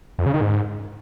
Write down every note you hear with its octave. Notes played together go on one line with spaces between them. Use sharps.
F2
C#3
D#3
G#2